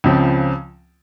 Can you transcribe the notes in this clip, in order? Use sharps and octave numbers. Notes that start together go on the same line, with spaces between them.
C#2 C#3 F3 C4